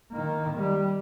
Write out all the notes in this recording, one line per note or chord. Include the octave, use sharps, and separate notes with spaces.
D#3 A#3
G3